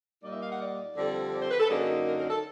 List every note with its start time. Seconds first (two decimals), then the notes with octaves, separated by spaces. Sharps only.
0.23 A#2 G3 A#3 D#4 D5
0.32 E5
0.42 F5
0.51 F#5
0.60 D5
0.96 F2 D3 G3 C4
1.33 D5
1.42 C5
1.51 B4
1.60 A4
1.69 F#2 D3 F#3 A#3 D#4 G#4
2.06 A#4
2.18 A#4
2.30 A4